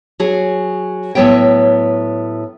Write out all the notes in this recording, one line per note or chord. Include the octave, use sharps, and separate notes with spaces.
F#3 G#4
A2 F#3 B3 C#5 G5